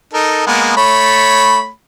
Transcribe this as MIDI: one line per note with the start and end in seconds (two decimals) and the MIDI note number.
0.14 0.47 63
0.14 0.47 69
0.14 0.47 70
0.47 0.75 56
0.47 0.75 58
0.47 0.75 59
0.77 1.69 57
0.77 1.69 73
0.77 1.69 83